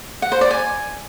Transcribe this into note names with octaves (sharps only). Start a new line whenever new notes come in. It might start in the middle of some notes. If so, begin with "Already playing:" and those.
F#5
C5
D5
G#5